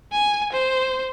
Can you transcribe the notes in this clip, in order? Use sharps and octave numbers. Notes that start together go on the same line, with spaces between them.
G#5
C5